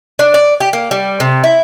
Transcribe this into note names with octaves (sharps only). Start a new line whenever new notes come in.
D4
D5
G4
A#3
G3
C3
E4